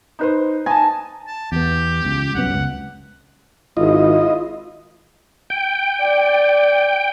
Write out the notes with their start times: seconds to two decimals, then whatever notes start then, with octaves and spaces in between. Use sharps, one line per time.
0.19 D#4 B4 C5
0.66 D#4 G#5 A5
1.27 A5
1.52 E2 B3 G4
2.05 C#2
2.35 C2 F#2 B3 F#5
2.54 C#2
3.77 G#1 E4 F4 D#5
5.50 G5
6.02 D5